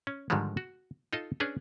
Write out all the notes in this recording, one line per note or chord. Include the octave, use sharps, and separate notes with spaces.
C#4
G#2 D3 D#3 F3 G3 G#3
F#4
D#4 F4 A4 D#5
C#4 D4 G#4 B4